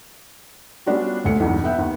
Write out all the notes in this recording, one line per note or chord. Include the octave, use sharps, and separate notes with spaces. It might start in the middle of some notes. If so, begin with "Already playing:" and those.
G3 B3 C#4 D4 F4 F#4
D#1 D2 C#7
B1 E2 G2
B3 E5 G5
D#2 B3